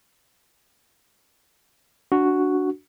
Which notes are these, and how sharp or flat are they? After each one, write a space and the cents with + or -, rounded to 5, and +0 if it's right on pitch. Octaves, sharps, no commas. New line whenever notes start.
D4 -10 F#4 +0